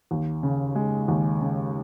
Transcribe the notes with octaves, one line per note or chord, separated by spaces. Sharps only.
D#2
C#3
G#3
D#2
C#3